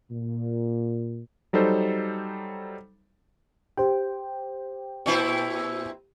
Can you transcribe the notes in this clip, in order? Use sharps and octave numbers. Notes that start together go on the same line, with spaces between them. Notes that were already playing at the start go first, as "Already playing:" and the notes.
A#2
F#3 G3 D#4 A4 C5
G4 C5 G5
A#2 C4 E4